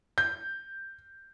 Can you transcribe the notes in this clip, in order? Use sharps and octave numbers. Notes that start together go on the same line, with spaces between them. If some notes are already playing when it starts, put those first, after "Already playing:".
G6